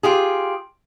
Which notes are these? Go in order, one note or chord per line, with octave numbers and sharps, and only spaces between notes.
F4 G4 G#4